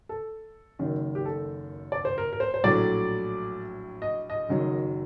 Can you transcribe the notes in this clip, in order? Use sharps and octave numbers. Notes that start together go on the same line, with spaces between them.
A4
F#1 F#2 D#3
G4
A4
D5
C5
A#4
A#4
C5
C5
A#1 A2 F#3 D5
D#5
D#5
F#1 F#2 D#3 F#3